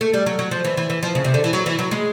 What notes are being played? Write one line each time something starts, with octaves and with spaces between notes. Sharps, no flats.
A3
G3
F#3
F#3
F3
E3
E3
E3
F3
C#3
C3
D3
E3
F#3
E3
F#3
G#3